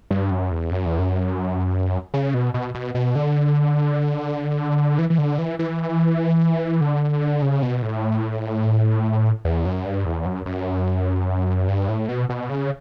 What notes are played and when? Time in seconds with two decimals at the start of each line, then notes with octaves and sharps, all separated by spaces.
0.11 G2
0.31 F#2
0.51 E2
0.71 F#2
0.85 E2
0.99 F#2
2.14 C#3
2.34 B2
2.54 B2
2.75 B2
2.95 B2
3.15 D3
4.98 E3
5.10 E3
5.18 D3
5.38 E3
5.59 E3
6.81 D3
7.42 C#3
7.62 B2
7.82 A2
9.45 E2
9.65 F#2
9.85 G2
10.06 E2
10.26 F#2
10.46 F#2
11.68 G2
11.89 A2
12.09 B2
12.29 B2
12.49 C#3